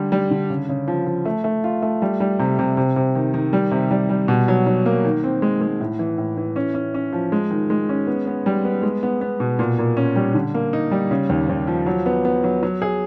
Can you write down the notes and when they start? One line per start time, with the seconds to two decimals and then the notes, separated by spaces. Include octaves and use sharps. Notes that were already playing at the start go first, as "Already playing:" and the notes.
Already playing: D3 G3
0.12 G3
0.31 D3
0.50 C#3
0.69 C#3
0.88 F3
1.06 F3
1.25 A3
1.44 A3
1.64 F4
1.82 A3
2.02 G3
2.20 G3
2.39 C3
2.59 C3
2.77 C3
2.96 C3
3.15 D#3
3.34 D#3
3.53 G3
3.71 C3
3.91 G3
4.10 G3
4.28 B2
4.48 F#3
4.67 F#3
4.86 A#3
5.05 D#3
5.24 C4
5.42 G#3
5.61 G#3
5.80 A2
5.99 E3
6.18 A2
6.37 E3
6.56 C#4
6.74 C#4
6.94 C#4
7.12 F3
7.32 G#3
7.51 D#3
7.70 G#3
7.89 C#4
8.07 B3
8.27 B3
8.46 G3
8.65 B3
8.83 G#3
9.03 B3
9.21 B3
9.40 B2
9.59 A#2
9.79 A#2
9.97 C#4
10.16 G3
10.34 D3
10.54 A#3
10.73 D#4
10.91 G3
11.11 C#3
11.29 D#2
11.49 D#2
11.67 F3
11.86 F#3
12.06 B3
12.25 B3
12.44 F#3
12.63 F#3
12.82 G#4